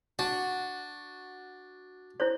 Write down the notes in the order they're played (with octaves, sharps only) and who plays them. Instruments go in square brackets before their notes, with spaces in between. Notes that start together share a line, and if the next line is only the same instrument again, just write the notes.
[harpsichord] D4 [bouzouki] F#4
[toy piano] E4 C5 C#5